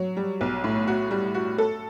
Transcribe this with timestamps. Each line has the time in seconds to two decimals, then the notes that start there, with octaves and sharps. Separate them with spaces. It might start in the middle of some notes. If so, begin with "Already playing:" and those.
Already playing: F#3
0.17 G3
0.41 B1
0.64 A2
0.88 F#4
1.11 G3
1.34 F#4
1.58 A4